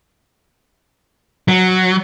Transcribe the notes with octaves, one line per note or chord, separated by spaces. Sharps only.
F#3